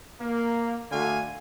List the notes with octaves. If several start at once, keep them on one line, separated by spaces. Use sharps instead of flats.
A#3
D3 A3 F#4 F5 G#5